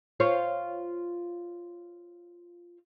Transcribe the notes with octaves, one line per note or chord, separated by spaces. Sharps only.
F4 C5 C#5